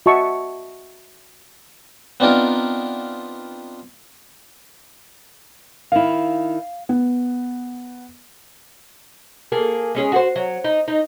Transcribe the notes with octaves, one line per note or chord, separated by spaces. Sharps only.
F#4 D#5 E5 A5 C#6
B3 C4 D4 D#4 F4 A#4
D#3 E4 F5
B3
A#3 G#4 A4
G#3 C#4 G#4
F#4 G#4 C5
F#3
D#4
D#4